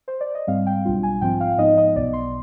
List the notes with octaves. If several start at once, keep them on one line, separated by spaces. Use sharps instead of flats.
C5
D5
D#5
G#2 G3 C4 F5
G5
B1 B2 G3 D4 F4
G#5
G#2 F3 C4 F4 G5
F5
G#2 F3 B3 D#4 D#5
D#5
B1 B2 B3 D5
C6